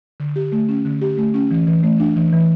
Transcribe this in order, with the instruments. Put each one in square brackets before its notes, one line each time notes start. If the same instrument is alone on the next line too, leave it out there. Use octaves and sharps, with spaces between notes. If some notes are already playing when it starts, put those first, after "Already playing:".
[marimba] D3
G4
A3
C#4
D3
G4
A3
C#4
E3
E3
A3
D4
E3
E3